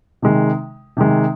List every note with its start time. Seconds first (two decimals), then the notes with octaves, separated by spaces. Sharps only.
0.22 C3 D#3 G#3
0.97 C3 D#3 G#3